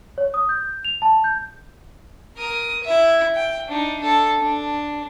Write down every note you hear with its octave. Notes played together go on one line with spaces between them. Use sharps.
C#5
D#6
G6
F7
A5
G6
A#4 D#6
E4 E5
G5
D4 D#4
D4 A4
D4